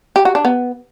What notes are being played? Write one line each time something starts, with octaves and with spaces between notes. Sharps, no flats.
G4
F#4
D4
B3